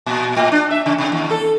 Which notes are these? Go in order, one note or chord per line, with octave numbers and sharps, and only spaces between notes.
A#2
A2
D4
E5
C#3
C3
D#2
A4